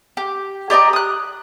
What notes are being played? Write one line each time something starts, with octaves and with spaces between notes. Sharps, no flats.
G4
G4 D5 D#5 A#5
D#6 F#6